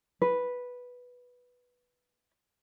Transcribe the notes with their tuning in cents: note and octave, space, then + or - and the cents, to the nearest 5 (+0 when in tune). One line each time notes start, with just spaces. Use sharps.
B4 -5